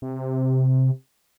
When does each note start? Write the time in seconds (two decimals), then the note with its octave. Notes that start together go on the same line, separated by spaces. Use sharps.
0.02 C3